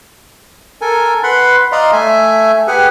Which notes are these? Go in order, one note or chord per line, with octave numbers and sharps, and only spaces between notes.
A4 A#4 G#5
B4 F#5 B5 C6
D5 D#5 F5 A#5 C6
A3 E5 G#5
G4 G#4 B4 F#5 G#5